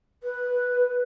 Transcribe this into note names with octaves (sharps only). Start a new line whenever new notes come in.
B4